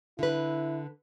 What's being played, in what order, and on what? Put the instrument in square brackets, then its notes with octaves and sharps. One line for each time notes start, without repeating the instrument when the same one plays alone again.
[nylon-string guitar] D3 B4 [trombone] E4